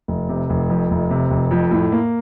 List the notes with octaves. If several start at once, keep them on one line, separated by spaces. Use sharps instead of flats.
F1
C3
F1
F2
F1
C3
F1
F2
A2
A#3